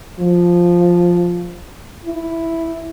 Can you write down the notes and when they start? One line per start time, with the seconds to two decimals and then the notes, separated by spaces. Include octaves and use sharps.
0.20 F3
2.05 E4